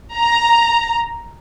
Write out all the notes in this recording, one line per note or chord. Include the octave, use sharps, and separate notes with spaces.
A#5